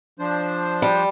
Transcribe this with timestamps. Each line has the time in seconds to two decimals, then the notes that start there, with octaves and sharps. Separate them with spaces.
0.19 F3 D4 C5
0.82 G3